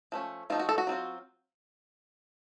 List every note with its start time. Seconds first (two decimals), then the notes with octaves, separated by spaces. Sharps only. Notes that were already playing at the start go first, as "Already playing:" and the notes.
0.12 F3 A3 C#4
0.50 F3 A3 D#4 F4
0.59 F#4
0.69 A4
0.78 F#4
0.87 F#3 A3 C4 F4